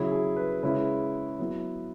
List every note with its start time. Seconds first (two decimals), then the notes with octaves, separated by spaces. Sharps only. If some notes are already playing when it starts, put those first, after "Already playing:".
Already playing: C#3 F#3 E4 G#4
0.12 G#4
0.37 B4
0.63 C#3 G#3 C#4 E4 B4
1.39 F#3 B3 E4